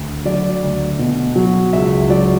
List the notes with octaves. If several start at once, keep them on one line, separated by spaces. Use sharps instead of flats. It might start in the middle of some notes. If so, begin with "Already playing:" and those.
Already playing: D2
F#3 D5
D2
B2
F#3
C#2 E5
F#3 D5